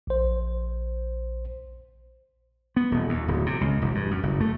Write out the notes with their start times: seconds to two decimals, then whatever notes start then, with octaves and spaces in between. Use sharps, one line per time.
0.07 A#1 C5
2.76 B3
2.91 D#1
3.09 D#2
3.28 D1
3.46 C3
3.61 C#2
3.82 E1
3.95 G2
4.11 F#2
4.23 F#1
4.40 A3